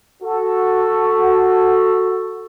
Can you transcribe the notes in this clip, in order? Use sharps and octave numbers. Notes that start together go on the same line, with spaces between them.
F#4 A4